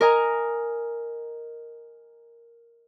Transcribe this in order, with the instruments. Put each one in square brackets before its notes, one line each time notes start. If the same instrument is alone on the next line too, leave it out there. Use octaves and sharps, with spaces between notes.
[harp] A#4 D#5 G#5 A#5